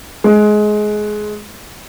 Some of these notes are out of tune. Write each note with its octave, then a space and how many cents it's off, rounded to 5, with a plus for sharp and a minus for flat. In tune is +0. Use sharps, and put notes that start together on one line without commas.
G#3 +20